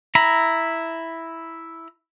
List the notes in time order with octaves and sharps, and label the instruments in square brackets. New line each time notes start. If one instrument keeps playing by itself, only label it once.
[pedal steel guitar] E4 A#5 B5